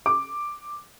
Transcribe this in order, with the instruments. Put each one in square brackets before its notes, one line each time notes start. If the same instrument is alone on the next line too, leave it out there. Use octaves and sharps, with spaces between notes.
[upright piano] D6